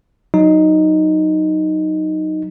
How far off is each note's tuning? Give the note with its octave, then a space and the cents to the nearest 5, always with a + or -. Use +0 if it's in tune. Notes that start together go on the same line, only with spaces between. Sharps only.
F#3 +0 D#4 +0